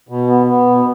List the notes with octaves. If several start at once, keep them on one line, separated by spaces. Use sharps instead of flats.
B2
B3
B3
B2